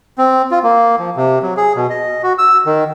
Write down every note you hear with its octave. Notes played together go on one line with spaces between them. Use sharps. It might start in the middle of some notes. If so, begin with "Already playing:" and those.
C4
F4
A#3
F3
C3
F#3
G#4
B2
D#5
F#4
E6
D#3